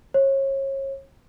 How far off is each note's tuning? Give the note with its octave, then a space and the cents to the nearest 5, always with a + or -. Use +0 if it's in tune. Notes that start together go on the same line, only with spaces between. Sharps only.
C#5 -35